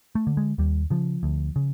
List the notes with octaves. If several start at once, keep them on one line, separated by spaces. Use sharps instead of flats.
A3
D3
G#3
D#2 G3
C#3 F3
D2
C#3